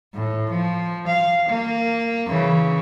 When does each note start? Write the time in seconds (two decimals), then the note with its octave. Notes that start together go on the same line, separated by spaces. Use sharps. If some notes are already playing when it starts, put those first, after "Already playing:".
0.14 A2
0.50 F3
1.07 F5
1.49 A#3
2.28 C#3 E3